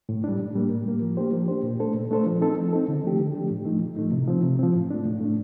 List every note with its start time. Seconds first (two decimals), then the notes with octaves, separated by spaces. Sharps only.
0.09 A2
0.24 G3 D4
0.39 A2
0.55 G3 A#3
0.70 A2
0.85 G3 A#3
1.02 F3
1.17 A#3 D4 G4 C5
1.32 F3
1.48 A#3 D4 G4 C5
1.63 A#2
1.80 A3 D4 A4 C5
1.94 A#2
2.11 A3 D4 A4 C5
2.26 F3
2.41 C4 D#4 A4
2.56 F3
2.73 C4 D#4 A4
2.88 D3
3.03 F3 A3 D4 G4
3.19 D3
3.34 F3 A3 D4 G4
3.51 A2
3.65 F3 A3 D#4
3.82 A2
3.96 F3 A3 D#4
4.12 C3
4.28 F3 C4
4.43 C3
4.59 F3 C4
4.74 A2
4.91 A3 D4
5.05 A2
5.21 A3 D4